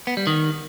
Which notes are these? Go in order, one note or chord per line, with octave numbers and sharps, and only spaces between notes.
B3
G3
D#3